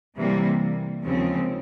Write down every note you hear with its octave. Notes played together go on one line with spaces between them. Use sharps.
C3 E3 G3 A#3
D#2 C#3 F3 G#3 C4